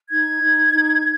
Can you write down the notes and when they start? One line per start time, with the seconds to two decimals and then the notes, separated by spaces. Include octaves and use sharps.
0.10 D#4 G#6
0.42 D#4
0.73 D#4